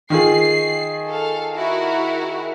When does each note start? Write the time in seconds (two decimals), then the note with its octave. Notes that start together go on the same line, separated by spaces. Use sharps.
0.10 D#3 F4 G#4 C7
1.08 A4 F5
1.55 E4 F#4 A#4